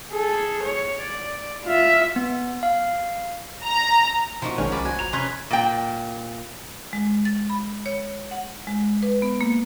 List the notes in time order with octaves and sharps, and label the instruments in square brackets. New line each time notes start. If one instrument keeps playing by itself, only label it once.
[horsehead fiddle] G#4 A4
C#5
D5
F4 E5
[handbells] B3
F5
[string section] A#5
[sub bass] B2 [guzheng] F3 A#3 F#4 [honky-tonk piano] D#4 A5
[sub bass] A#1 [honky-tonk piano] D#3 G#3 C#4 [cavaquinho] C#5 G5
[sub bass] C2 [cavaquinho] D5 [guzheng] B5
[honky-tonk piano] F#4 [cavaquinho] G#5
[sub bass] G1 [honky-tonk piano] A#5 F7
[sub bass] C3 [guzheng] C#4 D#5 A#5 [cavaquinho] B4 [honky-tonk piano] C6 F#6 G#6
[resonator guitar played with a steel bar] A#2 G5
[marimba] G#3
A6
B5
C#5
F#5
G#3
B4
B3
A#3